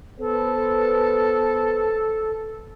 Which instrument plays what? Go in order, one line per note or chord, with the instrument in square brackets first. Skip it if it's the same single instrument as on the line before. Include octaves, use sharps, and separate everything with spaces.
[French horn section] B3 B4 C5 [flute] A4